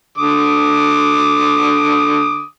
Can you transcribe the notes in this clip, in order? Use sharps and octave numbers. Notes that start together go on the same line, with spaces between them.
D3 D6 D#6